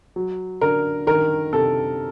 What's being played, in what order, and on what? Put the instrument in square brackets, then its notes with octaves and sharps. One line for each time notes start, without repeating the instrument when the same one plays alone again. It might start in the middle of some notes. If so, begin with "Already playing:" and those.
[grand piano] F#3
[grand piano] D3 [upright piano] A#4
[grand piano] D#3 [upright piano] A#4
[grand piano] C3 [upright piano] A4